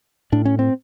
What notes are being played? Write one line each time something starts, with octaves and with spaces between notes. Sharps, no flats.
A2 D4
C#4
C4